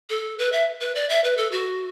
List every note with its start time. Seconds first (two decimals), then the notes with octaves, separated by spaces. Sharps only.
0.10 A4
0.39 B4
0.52 E5
0.81 B4
0.95 D5
1.09 E5
1.24 B4
1.37 A4
1.52 F#4